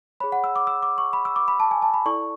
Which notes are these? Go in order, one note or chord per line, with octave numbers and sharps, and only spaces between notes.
G#4 C#5 B5
F#5
E6
D6
E6
D6
C#6
B5
E6
D6
B5
A5
G#5
A5
B5
E4 A4 D5 C#6